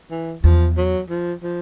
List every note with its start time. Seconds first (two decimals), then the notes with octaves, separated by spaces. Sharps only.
0.10 E3
0.44 E2 F3
0.77 F#3
1.10 F3
1.43 F3